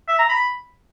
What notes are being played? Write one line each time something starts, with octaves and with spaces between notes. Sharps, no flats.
E5
A#5
B5